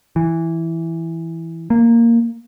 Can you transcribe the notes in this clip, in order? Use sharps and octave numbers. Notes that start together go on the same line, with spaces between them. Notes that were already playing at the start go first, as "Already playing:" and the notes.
E3
A#3